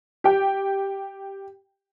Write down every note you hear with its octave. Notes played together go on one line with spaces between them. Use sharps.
G4 G5